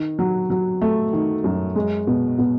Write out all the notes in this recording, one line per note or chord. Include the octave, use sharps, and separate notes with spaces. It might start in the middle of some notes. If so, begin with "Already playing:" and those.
Already playing: D#3
F#3
F#3
A3
D#3
F#2
G#3
B2
B2